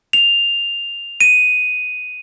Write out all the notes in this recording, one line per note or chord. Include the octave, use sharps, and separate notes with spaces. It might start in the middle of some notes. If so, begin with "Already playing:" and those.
F7
D#7